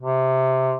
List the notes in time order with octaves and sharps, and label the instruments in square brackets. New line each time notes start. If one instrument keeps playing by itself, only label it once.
[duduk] C3